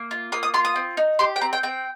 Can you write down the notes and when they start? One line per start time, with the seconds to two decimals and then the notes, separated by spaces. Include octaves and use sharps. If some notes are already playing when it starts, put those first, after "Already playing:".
Already playing: A#3
0.11 F4
0.32 A#3 D#6
0.43 D#6
0.54 F4 C6
0.65 D#6
0.76 C4
0.97 D#4
1.19 G4 C6
1.36 G5
1.41 C4 A#5
1.53 G5
1.63 C4 G5